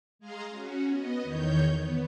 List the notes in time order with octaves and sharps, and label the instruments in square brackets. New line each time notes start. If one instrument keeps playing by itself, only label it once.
[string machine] G#3 G#4 F5 A#5 C6
C#4 F#4
B3 D#5
E2 D#3 C#5 G6
B3